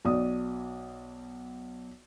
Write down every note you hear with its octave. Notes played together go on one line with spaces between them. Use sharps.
B1 D5 D#6